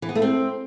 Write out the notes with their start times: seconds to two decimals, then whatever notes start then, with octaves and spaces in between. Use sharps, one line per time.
0.02 E3
0.09 B3
0.15 A3
0.22 C4